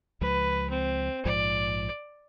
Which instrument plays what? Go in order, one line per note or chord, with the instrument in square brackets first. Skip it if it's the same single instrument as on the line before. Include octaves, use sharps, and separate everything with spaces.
[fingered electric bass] C#2 F3 G#3 [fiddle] B4
[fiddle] C4
[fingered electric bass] A#1 G#2 F3 [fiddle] D5